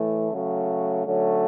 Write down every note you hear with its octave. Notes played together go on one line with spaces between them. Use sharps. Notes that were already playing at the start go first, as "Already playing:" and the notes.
Already playing: A2 E3 A3
C#3 F#3 A3
D3 F#3 A3 C#4